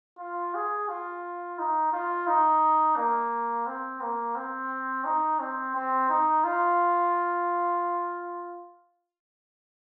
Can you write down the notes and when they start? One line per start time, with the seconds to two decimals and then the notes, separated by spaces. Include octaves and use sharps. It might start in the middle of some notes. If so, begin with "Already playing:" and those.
0.19 F4
0.55 G#4
0.89 F4
1.59 D#4
1.93 F4
2.28 D#4
2.97 A#3
3.66 C4
4.01 A#3
4.36 C4
5.05 D#4
5.40 C4
5.75 C4
6.09 D#4
6.44 F4